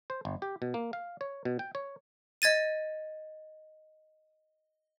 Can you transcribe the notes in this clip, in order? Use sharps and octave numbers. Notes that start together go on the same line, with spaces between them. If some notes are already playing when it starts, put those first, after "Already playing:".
C5
G1
G4
B2
A#3
F5
C#5
B2
G5
C#5
D#5 G#6 A6 D#7